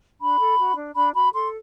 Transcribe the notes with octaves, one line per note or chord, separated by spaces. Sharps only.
D4 B5
A4
F#4
D4
D4 B5
F#4 B5
A4 C6